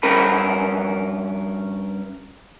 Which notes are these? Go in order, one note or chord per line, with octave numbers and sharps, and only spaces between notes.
G2 C#4 A#4 B5